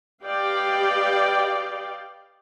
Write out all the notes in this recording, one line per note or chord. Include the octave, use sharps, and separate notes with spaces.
G4 B4 D5 D#5 F5 G5